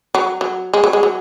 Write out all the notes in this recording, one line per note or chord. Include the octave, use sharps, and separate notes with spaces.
F#3
F#3
G#3
F#3
G#3
F#3